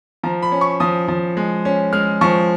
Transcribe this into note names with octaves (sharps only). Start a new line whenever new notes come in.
F3 A#5
B5
C#4
C#6
F3 D#6
F3
G#3
C#4
G#3 F6
F3 C#6